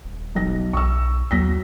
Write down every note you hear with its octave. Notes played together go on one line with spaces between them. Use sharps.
D#1
B1 A#6
B1 C#6 E6
D#2 F#3 A#6 B6